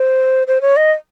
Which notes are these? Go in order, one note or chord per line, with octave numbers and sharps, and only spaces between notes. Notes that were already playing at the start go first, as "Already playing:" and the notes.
Already playing: C5
C5
C#5
D#5